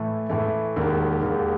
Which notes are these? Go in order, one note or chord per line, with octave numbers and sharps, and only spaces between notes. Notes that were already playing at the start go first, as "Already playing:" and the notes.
Already playing: A2 E3 A3
A2 E3 A3
E1 D#2 D#3
E1 D#2 D#3